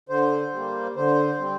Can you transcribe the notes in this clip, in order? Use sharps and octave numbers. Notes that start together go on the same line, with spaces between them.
D3 C5
G3 A#3
D3 C5
G3 C4